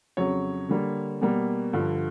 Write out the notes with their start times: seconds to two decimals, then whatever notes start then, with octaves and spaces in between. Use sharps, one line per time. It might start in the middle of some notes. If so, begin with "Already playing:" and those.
0.17 F2 C#3 F#3 C#5
0.69 D3 G3 A#3
1.21 B2 G3 A#3
1.73 G2 D3 F3